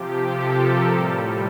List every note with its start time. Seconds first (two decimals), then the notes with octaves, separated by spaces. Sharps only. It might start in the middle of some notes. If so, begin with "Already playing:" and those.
Already playing: C3 F3 G4
0.26 A4
0.55 A#4
0.83 A2 G3 C5